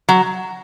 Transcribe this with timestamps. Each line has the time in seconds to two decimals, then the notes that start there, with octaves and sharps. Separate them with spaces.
0.09 F#3